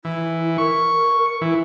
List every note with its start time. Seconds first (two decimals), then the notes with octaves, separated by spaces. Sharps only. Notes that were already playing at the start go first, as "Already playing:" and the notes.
0.05 E3 E4
0.58 A#4 C#6
1.41 E3